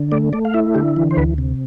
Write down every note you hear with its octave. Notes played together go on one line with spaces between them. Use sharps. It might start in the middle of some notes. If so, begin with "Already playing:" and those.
Already playing: D3
A3 D5
A3 D5
F5
E4 E5
D3 G4
E3
C5
D2 B4
C3